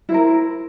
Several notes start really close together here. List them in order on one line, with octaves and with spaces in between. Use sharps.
E4 C5 A#4